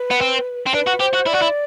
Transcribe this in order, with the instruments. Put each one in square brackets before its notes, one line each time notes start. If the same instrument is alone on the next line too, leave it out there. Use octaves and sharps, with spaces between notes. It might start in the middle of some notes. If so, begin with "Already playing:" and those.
Already playing: [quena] B4
[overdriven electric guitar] B3
C4
C4
[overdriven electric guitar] D4 [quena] B4
[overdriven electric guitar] F#4
[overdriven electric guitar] G4 [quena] C5
[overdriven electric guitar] F#4
[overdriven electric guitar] E4 [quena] D5
[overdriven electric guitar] F#4
E4